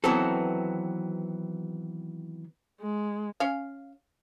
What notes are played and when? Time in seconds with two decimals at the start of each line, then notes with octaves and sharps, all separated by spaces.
0.04 D#3 E3 F#3 B3 C4 A4
2.81 G#3
3.40 C#4 F5